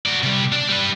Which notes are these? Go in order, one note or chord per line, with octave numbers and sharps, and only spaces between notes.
F#4 D5
C3 G3
D4 D5
G3 B4